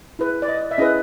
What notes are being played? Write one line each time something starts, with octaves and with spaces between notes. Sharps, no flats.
E4 G#4 B4
D5
D#5
E5
C#4 E4 G#4 B4 D#5